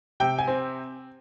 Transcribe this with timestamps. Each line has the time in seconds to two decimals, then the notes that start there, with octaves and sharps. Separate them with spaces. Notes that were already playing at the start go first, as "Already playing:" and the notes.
0.20 C3 G5
0.38 G#5
0.48 C4